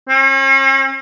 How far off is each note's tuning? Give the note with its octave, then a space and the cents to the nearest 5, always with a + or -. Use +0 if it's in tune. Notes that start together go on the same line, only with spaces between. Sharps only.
C#4 -45